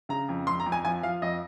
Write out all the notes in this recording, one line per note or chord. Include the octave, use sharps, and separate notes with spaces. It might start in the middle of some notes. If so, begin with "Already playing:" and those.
C#3 A#5
F2
F2 C6
A#5
F2
G#5
F3 G#5
F3 F5
F2 D#5